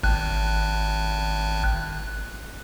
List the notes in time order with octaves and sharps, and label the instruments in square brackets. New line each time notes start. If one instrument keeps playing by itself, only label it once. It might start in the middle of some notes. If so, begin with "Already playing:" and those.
[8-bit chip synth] G#1 F#6